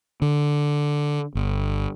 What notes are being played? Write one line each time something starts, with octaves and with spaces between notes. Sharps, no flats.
D3
G1